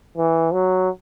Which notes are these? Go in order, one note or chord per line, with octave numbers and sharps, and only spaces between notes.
E3
F#3